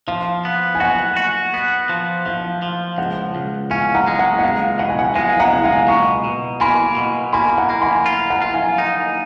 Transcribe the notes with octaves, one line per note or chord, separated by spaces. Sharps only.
F3 F5
B3
G#5
F#4 F#5
F#4
B3
F3
F3 F5
F3
C#2 F#5
C#2
C#4 F5 G#5
F#5 A#5
G#3
F#5 A#5
F#5
C#2 F5
B2 F#5
G#5
F#5
G#3 F5 G#5
F#5 A#5
C#2
F5 G#5
B2 A#5 C#6
B2
A#3 G#5 B5
B2
A#3 G#5 B5
F#5 A#5
A#3
G#5 B5
F4
F#5 A#5
F4
F5 G#5
D#4